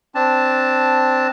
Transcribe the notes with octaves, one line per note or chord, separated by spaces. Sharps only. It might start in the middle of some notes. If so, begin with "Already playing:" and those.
C4 D4 A5